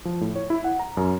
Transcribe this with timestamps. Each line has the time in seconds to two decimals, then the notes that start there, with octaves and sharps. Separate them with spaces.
0.05 F3
0.21 A2
0.36 C#5
0.50 E4
0.64 F#5
0.79 A#5
0.97 F#2